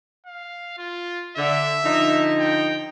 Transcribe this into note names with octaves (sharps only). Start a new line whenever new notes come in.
F5
F4
D3 E5
D3 F3 D#4
G5